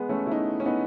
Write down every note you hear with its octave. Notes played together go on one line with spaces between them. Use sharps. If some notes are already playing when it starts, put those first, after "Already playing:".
Already playing: G#3 B3
A3 C#4
E4
B3 D#4
C#4
B3 D#4